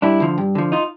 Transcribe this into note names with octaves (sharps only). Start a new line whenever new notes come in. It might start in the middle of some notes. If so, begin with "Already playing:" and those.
G2 D4 E4
D3 F3
G2
D3 F3
D#4 F4